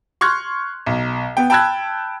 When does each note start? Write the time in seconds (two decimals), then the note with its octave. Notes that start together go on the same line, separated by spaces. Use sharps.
0.21 C6 C#6 F6 F#6 G#6
0.86 B1
1.37 B3 G5
1.50 G5 A5 B5 E6 F#6 G#6